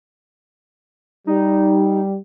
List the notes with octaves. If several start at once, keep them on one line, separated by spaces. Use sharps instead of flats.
G3 D#4